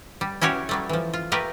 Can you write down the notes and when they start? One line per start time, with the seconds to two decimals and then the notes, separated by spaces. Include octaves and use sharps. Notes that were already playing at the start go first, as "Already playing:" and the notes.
0.21 G3
0.41 C#4 E4 F#4 G4 C#5
0.69 F#3 G3 A3
0.89 E3 F3
1.13 F4
1.32 A3 G4 A#4 B4 D#5